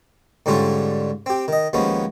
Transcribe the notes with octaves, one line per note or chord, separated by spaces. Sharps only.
G#2 D3 G3 C#4 D4 F4
C4 G4
D#3 D#5
D#2 F3 G#3 B3 C#4